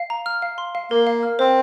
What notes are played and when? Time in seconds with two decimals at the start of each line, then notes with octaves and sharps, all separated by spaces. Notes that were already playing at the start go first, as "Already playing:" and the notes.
Already playing: F5
0.10 A#5
0.26 F6
0.42 F5
0.58 C6
0.75 F5
0.90 A#3 A#4
1.07 F5
1.23 F6
1.39 C4 C5